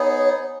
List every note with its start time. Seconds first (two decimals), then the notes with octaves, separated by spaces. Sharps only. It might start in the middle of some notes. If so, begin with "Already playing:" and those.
Already playing: B3 D#4 G#4 C#5